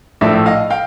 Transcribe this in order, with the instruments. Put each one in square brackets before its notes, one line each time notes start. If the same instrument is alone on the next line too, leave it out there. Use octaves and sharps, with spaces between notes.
[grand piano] A#1 A2 F3 A3 D5 E5
D#5 F5
F5 G5